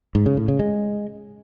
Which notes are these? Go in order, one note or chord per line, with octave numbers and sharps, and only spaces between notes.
G#2
C#3
A2
C#3
G#3